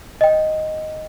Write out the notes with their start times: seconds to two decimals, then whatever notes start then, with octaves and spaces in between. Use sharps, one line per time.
0.21 D#5 G5